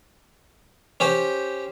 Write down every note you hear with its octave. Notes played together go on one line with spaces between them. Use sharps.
C#4 G4 C5